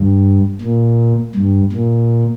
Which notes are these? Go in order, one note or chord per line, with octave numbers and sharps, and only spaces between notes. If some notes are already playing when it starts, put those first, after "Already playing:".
Already playing: G2
A#2
G2
A#2